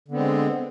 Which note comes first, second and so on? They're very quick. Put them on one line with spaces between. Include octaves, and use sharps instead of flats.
D3 B3 C4 G#3